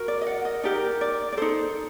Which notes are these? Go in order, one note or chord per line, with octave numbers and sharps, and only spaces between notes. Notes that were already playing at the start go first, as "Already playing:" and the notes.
Already playing: F#4 A#4
D5
D#5
F#5
D#5
D#4 G4 A#4 D5
D5
D5
D#4 A4 C5